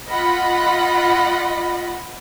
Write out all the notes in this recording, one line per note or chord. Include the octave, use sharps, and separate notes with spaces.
F4 D#5 F#5 B5